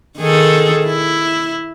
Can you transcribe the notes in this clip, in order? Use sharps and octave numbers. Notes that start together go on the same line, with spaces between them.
D#3 G#4 A4
E4